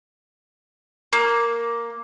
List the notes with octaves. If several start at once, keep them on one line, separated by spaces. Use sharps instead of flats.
A#3